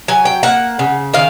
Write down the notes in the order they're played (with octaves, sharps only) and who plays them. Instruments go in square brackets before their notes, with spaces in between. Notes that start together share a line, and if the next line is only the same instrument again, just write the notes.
[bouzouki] F#3 G#5
G5
A#3 F#5
C#3
D#3 F5